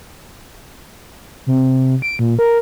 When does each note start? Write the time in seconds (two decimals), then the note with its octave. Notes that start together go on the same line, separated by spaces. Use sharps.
1.47 C3
2.02 D7
2.19 A#2
2.39 A#4